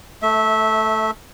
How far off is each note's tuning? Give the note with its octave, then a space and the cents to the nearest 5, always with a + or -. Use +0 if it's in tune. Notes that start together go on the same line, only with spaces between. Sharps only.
A3 +0 E5 -20